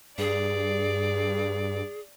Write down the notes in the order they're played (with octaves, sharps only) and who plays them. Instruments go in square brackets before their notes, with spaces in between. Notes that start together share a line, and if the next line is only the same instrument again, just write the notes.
[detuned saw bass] G2 [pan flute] G#4 [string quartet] D5